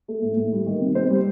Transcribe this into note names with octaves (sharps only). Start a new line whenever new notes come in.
A3
A2
A2
G3
D#3
C3
C4 C5
G3